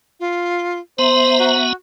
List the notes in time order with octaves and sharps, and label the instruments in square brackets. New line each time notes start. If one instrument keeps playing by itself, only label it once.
[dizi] F4
[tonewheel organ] B3 E5 A#5 [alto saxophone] C5 [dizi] C6
[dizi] F#4